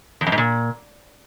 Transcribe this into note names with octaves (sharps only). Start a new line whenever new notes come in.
E2
F2
G#2
A#2